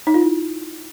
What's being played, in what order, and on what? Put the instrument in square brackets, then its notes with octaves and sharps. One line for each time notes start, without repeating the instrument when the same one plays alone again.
[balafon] D#4
F4
E4